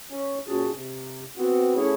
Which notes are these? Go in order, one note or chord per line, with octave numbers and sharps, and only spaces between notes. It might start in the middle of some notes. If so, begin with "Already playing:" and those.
C#4
A#2 C#4 F#4 G#4 A5
C3
B3 C4 F#4
A3 C#4 E4 G#4 C#5